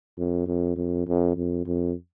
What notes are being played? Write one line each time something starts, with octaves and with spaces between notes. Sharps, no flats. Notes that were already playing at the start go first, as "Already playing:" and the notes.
F2
F2
F2
F2
F2
F2